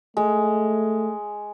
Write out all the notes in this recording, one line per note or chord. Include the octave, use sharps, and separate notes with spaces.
G#3 A3